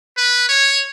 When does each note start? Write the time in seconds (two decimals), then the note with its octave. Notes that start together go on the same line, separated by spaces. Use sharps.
0.17 B4
0.49 C#5